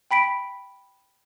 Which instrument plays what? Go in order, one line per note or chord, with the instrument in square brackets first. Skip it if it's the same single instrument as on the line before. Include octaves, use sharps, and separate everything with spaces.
[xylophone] G5 B5 B6 D7